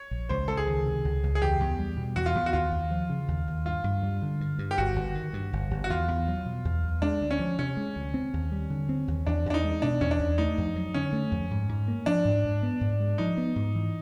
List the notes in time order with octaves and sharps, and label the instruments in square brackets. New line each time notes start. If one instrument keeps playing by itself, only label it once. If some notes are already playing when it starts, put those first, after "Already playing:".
Already playing: [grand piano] C#5
[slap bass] A#1
[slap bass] C#2 [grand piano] C5
[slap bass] C#2 [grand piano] A4
[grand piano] G#4
[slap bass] D#3
C3
C#2
C#2
[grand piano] G#4
[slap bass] E2 [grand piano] G4
[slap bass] E2
G3
B2
[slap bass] E2 [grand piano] F#4
[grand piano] F4
[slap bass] E2
[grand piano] F#4
[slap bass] D#2 [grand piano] F4
[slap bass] D#2
F3
C#3
D#2
D#2
[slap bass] G2 [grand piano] F4
[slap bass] G2
G3
D3
G2
G2
[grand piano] G4
[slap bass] G1 [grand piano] F#4
[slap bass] G1
D#3
G2
G1
G1
[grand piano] F#4
[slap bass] E2 [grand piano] F4
[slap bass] E2
F#3
B2
E2
E2
[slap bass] G#3 [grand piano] D4
[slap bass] D2
[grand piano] C#4
[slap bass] F3
[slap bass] C3 [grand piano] C#4
[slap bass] G#3
D2
C4
D#2
G3
D3
C4
D#2
[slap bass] E2 [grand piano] D4
[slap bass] E2 [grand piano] D4
[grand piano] D#4
[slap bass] G#3
[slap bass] B2 [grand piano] D4
[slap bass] E2 [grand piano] C#4
[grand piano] D4
[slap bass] E2
[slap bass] A3 [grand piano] D#4
[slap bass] F2
F#3
[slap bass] D3 [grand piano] C#4
[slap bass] A3
F2
G#2
G#2
A#3
[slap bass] F3 [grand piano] D4
[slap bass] G#2
G#2
B3
G#2
G#3
[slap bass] F3 [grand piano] D#4
[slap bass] B3
G#2
E3